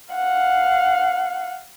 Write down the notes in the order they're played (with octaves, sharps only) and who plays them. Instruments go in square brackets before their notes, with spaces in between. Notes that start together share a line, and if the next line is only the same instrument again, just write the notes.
[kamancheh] F5 F#5